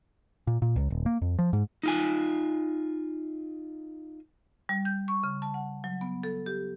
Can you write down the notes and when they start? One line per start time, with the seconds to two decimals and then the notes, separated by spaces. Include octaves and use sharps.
0.47 A#2
0.62 A#2
0.76 C#2
0.90 D#1
1.06 A#3
1.22 F2
1.39 F3
1.53 G#2
1.83 D#4 F4 G#5
4.69 G3
4.85 G6
5.08 C#6
5.23 C#3
5.42 A5
5.54 F#5
5.84 F#3
6.01 B3
6.23 A4
6.46 G4